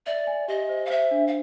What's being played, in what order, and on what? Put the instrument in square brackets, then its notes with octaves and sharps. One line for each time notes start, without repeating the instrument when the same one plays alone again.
[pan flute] D5 [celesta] E5
[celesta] G#5
[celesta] G4 [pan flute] D#5
[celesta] C5
[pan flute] F5
[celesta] C5 [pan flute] E5
[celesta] D4
[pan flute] F5